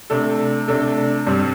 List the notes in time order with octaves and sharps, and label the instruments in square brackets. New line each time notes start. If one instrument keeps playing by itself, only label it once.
[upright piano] C3 A3 D4 A4
C3 A3 D4 A4
G2 G3 C4